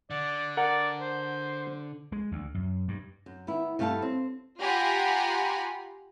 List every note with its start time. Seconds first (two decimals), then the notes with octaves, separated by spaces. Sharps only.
0.10 D3 D5
0.57 A#4 D5 F#5
1.00 C5
2.12 G#3
2.32 D2
2.55 F#2
2.88 G2
3.26 F#2
3.47 D#3 B3 E4
3.79 G2 A3 E4 F5 F#5 A5
4.02 C4
4.60 F4 G4 F#5 G#5 A#5 B5